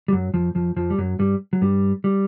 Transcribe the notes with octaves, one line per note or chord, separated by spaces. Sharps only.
G3
F#2 F#3
F2 F3
F2 F3
F2 F3
G3
F#2 F#3
G2 G3
F#3
G2 G3
G3